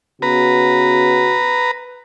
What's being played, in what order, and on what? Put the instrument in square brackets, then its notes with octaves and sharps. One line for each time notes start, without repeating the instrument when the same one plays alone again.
[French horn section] C#3 B3 F#4 [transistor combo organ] B4 A#5